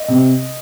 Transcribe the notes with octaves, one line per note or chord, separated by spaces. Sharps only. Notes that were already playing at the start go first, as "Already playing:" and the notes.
Already playing: D#5
C3